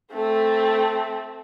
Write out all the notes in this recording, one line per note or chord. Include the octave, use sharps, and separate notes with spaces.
A3 C4